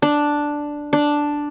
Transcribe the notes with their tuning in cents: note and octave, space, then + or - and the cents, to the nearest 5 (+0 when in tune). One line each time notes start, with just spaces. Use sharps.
D4 +0
D4 +0